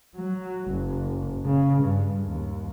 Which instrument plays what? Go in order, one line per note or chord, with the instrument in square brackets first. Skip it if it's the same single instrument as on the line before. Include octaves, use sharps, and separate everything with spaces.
[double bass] F#3
F#1
C#3
G2
D#2